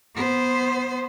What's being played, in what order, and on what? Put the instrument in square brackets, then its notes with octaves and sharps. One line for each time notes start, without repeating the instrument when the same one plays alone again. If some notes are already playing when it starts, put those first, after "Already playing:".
[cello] B3 C5